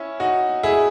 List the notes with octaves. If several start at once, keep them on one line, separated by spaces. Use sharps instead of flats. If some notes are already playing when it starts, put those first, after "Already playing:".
Already playing: C#4 E4
D#4 F#4
E4 G#4